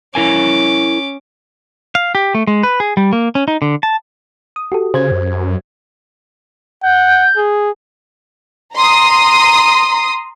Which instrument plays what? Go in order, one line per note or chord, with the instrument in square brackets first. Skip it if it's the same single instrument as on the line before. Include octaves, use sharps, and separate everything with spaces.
[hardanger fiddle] C#4 D6 [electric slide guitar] E4 A#4 G#5
[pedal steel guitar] F5
G4
A3
G#3
B4
G#4
G3
A#3
C#4
D#4
D3
A5
[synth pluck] D#6
F#4 G4 A4
[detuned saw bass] C#3 [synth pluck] C5 G#6
[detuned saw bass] F#2
[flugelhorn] F#5 [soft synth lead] G6
[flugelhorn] G#4
[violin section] A#5 C6 D#6